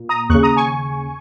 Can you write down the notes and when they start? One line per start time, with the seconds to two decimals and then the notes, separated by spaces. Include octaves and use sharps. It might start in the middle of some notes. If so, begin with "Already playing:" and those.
Already playing: A#2
0.09 A#5 D#6
0.29 D#2 C#3 C#6 F#6
0.43 A#5 D#6
0.57 G#5 C#6